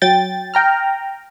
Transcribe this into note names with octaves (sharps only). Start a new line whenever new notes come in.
F#3 G5 A6
G5 A#5 F6